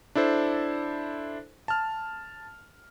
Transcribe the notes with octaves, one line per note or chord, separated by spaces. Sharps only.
D4 E4 A4 C5
A5 F6